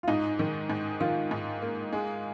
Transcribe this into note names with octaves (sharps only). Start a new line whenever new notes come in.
F4
G#2 D#4
D#3
G#2
D#3 F4
G#2
A#3
G#3